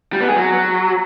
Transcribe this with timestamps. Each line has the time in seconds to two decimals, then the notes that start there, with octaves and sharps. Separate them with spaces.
0.13 G3
0.21 B3
0.28 G#4
0.36 F#3